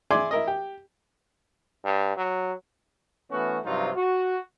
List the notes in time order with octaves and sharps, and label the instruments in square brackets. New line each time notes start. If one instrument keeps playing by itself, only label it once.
[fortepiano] E4 G#4 D5 G#5 C6 D6
E4 A#4 D#5
G4
[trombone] G2
F#3
[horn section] E3 A3 B3 C#4 F#4
G2 C3 F3 F#3 D#4 F4
F#4